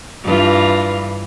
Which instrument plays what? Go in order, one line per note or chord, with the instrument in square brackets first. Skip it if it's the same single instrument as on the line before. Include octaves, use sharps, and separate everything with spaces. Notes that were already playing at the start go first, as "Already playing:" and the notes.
[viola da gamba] G2 E3 F4